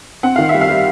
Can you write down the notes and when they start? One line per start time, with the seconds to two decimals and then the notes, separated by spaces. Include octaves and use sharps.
0.23 C4 F#5
0.36 D#3 F5
0.49 E5
0.54 G3
0.61 F5
0.69 G3